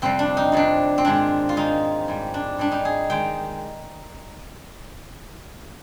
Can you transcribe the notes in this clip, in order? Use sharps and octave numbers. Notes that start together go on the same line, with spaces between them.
F2 C3 G3 C4
D4
D#4
F2 C3 G3 D4
C4
G#2 D#3 G#3 D4
F4
G#2 D#3 G#3 D#4
G#2 G3
D4
G#2 G3 D4
D#4
G#4
D#3 G#3 G5